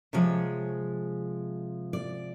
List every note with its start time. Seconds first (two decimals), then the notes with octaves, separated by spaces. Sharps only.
0.13 C3 F3 G#3 C#5
1.93 D5